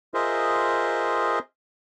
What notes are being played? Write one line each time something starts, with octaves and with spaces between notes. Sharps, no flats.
F4 G#4 A#4 C5 D#5 E5